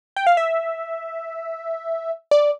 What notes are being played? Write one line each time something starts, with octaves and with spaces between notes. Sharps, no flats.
G5
F5
E5
D5